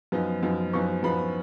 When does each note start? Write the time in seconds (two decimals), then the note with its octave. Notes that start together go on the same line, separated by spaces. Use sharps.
0.12 F#2 F3 B3 D#4
0.43 F#2 F3 B3 D#4
0.73 F#2 F3 B3 D#4 C#6
1.03 F#2 F3 B3 D#4 B5